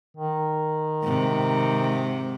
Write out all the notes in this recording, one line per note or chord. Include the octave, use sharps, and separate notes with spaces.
D#3
G#2 C3